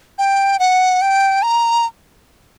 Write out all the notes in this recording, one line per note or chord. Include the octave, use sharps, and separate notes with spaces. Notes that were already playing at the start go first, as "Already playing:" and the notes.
G5
F#5
G5
A#5